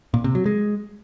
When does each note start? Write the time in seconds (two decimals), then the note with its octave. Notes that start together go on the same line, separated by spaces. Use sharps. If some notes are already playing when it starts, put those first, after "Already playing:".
0.14 A#2
0.24 C3
0.35 F#3
0.46 G#3